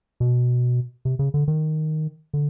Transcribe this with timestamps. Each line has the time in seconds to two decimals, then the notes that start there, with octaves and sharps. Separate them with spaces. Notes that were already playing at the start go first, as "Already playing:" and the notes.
0.20 B2
1.05 C3
1.19 C#3
1.34 D3
1.48 D#3
2.33 D3